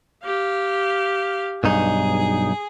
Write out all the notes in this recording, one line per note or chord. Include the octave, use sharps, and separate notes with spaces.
G4 F5
B1 G2 D#4 G#4